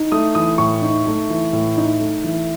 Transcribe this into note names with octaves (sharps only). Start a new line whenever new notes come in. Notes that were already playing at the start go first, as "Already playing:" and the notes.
Already playing: D#4
A3 D#6
E3 D#6
A2 C#6
D#4
A3
E3
A2
D#4
A3
E3